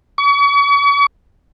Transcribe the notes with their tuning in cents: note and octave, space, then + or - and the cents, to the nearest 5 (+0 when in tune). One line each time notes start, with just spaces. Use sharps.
C#6 +40